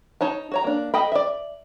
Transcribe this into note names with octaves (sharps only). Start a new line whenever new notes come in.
D#4 C#5 A5
F#4 C#5 A#5
A#3 D4
A4 D#5 G5 B5
D5 E5